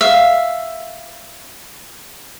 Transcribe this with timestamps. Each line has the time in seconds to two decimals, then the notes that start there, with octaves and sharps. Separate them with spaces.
0.01 E5 F5